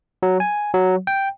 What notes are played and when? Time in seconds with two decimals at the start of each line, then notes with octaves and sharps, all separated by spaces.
0.23 F#3
0.40 G#5
0.74 F#3
1.07 G5